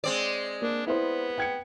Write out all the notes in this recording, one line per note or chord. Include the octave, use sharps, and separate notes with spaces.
G#3 C4 D5
A#3 D4
B3 E4 C5
G5 G#6 C#7